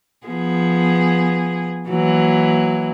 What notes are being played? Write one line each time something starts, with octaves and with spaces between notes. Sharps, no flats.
F3 B3 G#4
E3 F#3 A#3